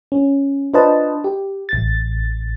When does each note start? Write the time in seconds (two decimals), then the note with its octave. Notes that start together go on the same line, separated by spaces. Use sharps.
0.12 C#4
0.74 D4 F4 B4 C5 D#5 A5
1.24 G4
1.69 A1 A6